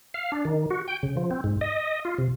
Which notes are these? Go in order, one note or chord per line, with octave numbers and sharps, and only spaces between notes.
F5
D4
D#3
F#4
G5
C#3
F3
C4
G#2
D#5
F4
C3